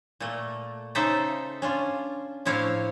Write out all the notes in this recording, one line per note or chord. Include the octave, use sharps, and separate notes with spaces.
A#2 A3
C#3 D#4 A4 C5 E5 A#5
C#4 D4 F4
A2 F3 D4 E4 C#5 F5